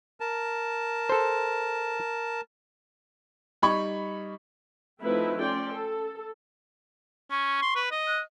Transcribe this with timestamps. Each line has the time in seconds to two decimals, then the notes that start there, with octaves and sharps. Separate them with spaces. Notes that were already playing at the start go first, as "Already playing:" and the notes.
0.20 A#4 A5
1.09 A4 C5
3.62 G3 D#4 B5 C#6 G#6
5.02 F3 A3 C4 D#4 E4 B4
5.39 C#4 D5 G5 C6
5.69 A4
7.31 C#4 C#6
7.62 C6
7.76 B4
7.91 D#5
8.07 F#6